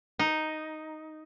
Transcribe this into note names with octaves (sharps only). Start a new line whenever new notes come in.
D#4